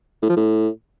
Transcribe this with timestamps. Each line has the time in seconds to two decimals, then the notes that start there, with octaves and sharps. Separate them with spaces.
0.22 A2
0.29 F3
0.37 A2